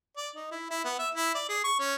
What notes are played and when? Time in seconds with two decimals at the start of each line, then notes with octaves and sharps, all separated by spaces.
0.17 D5
0.36 D#4
0.51 E4
0.70 E4
0.85 B3
0.99 E5
1.14 E4
1.35 D5
1.49 G#4
1.64 C#6
1.79 C#4